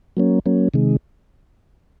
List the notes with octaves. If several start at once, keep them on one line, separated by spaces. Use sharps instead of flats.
F#3 A#3 C#4
F#3 A#3 C#4
C3 D#3 G#3